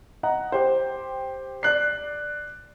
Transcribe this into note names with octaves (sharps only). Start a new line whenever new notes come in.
D#5 F#5 A#5
G4 C5
D5 F#6 C7